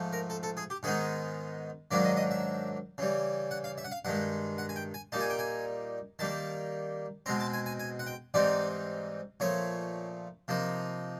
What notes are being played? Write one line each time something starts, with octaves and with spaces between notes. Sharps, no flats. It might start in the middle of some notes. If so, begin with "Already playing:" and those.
Already playing: G#2 F3 A3
A#4
A4
A4
G#4
G4
G#2 D#3 G#3 B3 D#4 G#4
G#2 D#3 F#3 A#3 D4 D5
D#5
D#5
E5
C#3 E3 G3
F#5
F5
E5
F#5
F5
G2 D#3 G#3 F#5
F#5
G#5
G5
G#5
A#2 G3 A#3 D#4 A5
G#5
G5
G#5
D#3 G3 A#3 A5
B2 G#3 C4 A#5
A5
G#5
G#5
G#5
F#5
G5
G#2 E3 G3 C4 D#4 D5
A#2 F3 A3 C#5
C3 F3 A#3 D#4